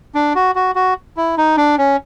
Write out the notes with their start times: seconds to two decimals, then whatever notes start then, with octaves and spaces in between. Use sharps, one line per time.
0.15 D4
0.35 F#4
0.55 F#4
0.75 F#4
1.17 E4
1.38 D#4
1.57 D4
1.78 C#4